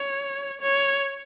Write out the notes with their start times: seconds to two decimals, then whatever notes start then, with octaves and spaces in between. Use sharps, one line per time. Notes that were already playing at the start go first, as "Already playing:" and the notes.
Already playing: C#5
0.62 C#5